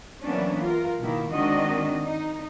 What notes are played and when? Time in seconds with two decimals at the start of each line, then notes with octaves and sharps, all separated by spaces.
0.23 E3 F#3 A#3 B3 C#4 D4
0.62 F4 A#4
1.00 B2 D#3 A#3 E4
1.31 D#3 G#3 C4 D4 F#4 D#5
2.03 D#4